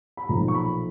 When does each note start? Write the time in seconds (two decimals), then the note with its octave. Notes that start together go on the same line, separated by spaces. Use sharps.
0.17 B5
0.29 B1 A#2 F3 A#5
0.48 C#6
0.55 B5